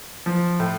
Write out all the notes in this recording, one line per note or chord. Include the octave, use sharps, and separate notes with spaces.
F3
A2